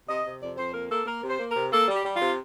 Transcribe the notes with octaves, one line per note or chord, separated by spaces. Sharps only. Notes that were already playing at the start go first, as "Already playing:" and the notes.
C3 D#5
C3
F2 D5
F2 C5
A#3 A#4
A#3 A4
A#3 A#4
C3
C5
A#3
C3 A#4
A#3 A4
G3
G4
G3
F4
C3